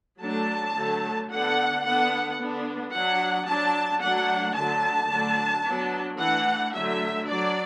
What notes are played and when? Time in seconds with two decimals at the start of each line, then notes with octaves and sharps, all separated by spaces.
0.21 F#3 A3 D4 A5
0.76 D3 F#3 A3
1.29 D3 B3 D4 F#5
1.85 D3 B3 D4 F#5
2.38 D3 B3 D4
2.93 F#3 D4 F#5
3.46 F#3 D4 A5
4.01 F#3 A3 D4 F#5
4.55 D3 F#3 A3 A5
5.10 D3 F#3 A3 D4
5.63 F#3 B3 D4
6.18 E3 A3 D4 F#5
6.72 D3 F#3 A3 E5
7.26 F#3 D4 D5